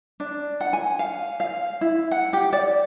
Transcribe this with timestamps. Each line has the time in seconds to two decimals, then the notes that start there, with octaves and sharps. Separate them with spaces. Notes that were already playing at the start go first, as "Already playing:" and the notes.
0.20 D4
0.60 F#5
0.73 G#5
0.99 F5
1.40 F5
1.81 E4
2.11 F#5
2.33 G4
2.53 D5